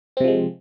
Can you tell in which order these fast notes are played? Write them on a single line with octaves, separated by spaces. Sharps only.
C4 C3 F3 G#3